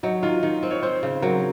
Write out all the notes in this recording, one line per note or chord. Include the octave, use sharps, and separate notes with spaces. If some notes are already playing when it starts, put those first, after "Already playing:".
F#3 D#4
D#3 F4
D#3 D#4
C4
C#5
C4 C5
C#3
F#3 A#4